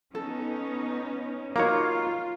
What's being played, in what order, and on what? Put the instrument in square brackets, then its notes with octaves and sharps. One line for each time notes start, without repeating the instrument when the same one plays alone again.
[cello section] B3 C#4 D#4 [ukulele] A4
[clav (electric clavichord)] A#3 C#5 [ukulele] D#4 F#4 A#5 [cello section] F4 F5